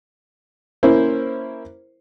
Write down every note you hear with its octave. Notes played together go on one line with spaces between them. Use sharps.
A#3 C#4 E4 C5